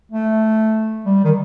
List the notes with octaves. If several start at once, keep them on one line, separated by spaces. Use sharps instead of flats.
A3
G3
D#3